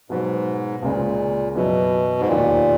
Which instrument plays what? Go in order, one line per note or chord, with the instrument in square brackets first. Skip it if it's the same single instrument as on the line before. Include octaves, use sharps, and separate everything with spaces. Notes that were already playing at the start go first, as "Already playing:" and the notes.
[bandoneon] G#2 [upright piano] B2 F#3 B3 F#4
[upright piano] C#2 C#3 G#3 [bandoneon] A#2
[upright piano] F#2 E3 B3 E4 [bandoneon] B2
[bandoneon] G#2
[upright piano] E1 D#2 D#3 A#3 D#4 [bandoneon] A#2